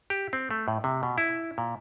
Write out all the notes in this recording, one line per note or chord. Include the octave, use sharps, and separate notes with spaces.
G4
C4
A3
A2
C3
B2
E4
A#2